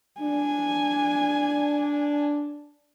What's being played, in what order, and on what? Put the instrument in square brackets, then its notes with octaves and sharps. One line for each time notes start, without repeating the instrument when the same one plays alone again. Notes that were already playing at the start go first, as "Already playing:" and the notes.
[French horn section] D4 [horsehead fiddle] G#5